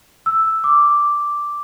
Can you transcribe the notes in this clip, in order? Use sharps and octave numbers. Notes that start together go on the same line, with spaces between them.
E6
D6